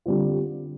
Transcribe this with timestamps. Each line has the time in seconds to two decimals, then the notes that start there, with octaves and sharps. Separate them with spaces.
0.06 D3 G3 C4 F4